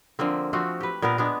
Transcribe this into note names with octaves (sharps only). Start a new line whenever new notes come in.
D3 F3 A#3 C4
F3 A3 C4 F#4
G4 B4
A#2 B3 D4 A#4
G#3 B3 D4